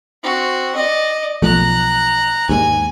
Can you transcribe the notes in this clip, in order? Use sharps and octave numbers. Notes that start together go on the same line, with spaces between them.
C4 F#4
D5 D#5
B1 F3 A3 A#5 F#6
D#2 G#2 G#5